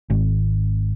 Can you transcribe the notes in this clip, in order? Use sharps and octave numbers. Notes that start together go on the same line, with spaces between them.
G#1